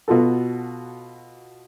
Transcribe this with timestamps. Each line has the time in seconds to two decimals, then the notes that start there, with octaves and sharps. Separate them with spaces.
0.08 B2 F4 F#4 A4